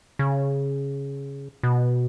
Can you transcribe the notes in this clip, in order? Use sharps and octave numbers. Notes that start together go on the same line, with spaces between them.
C#3
B2